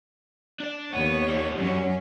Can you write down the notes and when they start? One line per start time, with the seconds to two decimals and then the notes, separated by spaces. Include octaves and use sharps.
0.60 D4 D5
0.93 D#2 B3 C#5
1.28 D#3 G3
1.58 F#2 F#3 C#4